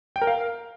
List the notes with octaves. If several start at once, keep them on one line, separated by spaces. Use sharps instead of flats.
G5
A#4
F5